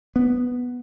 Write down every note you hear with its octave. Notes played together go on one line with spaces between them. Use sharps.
B3